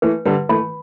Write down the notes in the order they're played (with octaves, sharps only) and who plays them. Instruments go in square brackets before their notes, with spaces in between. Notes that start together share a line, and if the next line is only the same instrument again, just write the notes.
[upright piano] E3 A3 [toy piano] B4
[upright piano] D3 G3 [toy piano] B4
[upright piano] E3 A3 [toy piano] B5